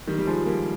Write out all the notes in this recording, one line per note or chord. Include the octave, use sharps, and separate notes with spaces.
D#3 G3
G3
F3 G#3
G3 A#3